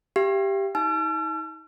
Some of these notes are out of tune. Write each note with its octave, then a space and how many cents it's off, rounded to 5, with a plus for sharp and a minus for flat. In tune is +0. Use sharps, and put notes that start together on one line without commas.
G4 +0 F5 -45
D#4 +45 A5 -45 E6 +45